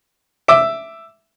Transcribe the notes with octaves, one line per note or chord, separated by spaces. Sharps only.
E5 D6